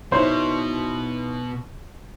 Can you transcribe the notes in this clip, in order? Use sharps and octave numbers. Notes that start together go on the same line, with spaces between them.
B2 D#4 E4 C5 C#5